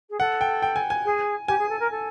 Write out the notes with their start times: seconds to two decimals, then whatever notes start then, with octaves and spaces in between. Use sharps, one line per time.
0.10 G#4
0.19 A4 F#5
0.41 G5
0.62 G5
0.76 G#5
0.90 G#5
1.05 G#4
1.47 G4 G#5
1.58 G#4
1.69 A4
1.80 A#4
1.91 A4